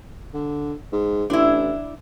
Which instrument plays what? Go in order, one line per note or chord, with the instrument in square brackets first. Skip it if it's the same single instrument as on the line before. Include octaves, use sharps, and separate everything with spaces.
[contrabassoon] D3
G#2
[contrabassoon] A1 [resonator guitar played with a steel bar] D4 E4